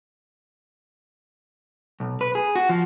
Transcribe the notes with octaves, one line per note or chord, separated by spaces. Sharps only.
B1
B4
G#4
F#4
F3